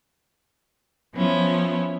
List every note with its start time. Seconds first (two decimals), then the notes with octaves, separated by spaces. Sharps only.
1.15 F3 B3 C#4 E4